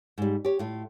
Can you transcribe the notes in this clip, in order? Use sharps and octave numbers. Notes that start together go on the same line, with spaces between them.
G#2 G3
G4 C#5
A2 F4